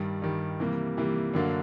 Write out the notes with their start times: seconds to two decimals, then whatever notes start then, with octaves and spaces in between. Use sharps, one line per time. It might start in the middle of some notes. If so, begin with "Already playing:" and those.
Already playing: G2 D#3 G3
0.22 G2 D#3 G3
0.60 C3 E3 G3 A#3
0.97 C3 E3 G3 A#3
1.34 F#2 D3 F#3 A#3 D4